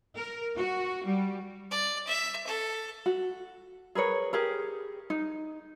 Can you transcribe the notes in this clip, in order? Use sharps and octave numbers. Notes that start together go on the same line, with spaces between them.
A#4
F#4
G3
D5
E5
A4
F#4
G#4 A#4 B4 C#5
G4 G#4 A#4
D#4